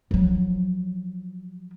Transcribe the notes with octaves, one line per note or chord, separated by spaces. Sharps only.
F3 F#3